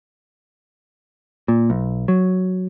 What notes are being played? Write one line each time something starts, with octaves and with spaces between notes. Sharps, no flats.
A#2
B1
F#3